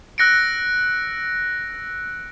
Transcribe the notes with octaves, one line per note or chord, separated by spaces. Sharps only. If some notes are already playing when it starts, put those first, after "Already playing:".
E6 F#6 A#6 C#7 D7